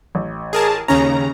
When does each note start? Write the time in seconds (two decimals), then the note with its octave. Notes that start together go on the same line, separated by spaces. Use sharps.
0.15 A1
0.53 G#4 A#4 A5
0.88 D#2 C#3 C#4 A#5